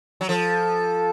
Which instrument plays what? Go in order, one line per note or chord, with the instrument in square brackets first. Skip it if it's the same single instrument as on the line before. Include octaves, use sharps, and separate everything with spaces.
[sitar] F#3
[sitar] F3 [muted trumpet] A4